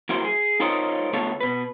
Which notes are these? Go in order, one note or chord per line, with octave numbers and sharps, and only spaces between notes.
F#3 A#3 E4 F#4 C5
G#4
D#4 F4 A#4 C5 C#5 D#5
D3 A3 B3 F4 A4 C#5
B2 B4